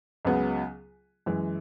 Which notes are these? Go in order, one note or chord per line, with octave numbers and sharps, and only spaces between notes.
C#2 C#3 F#3 B3
F#2 E3 G#3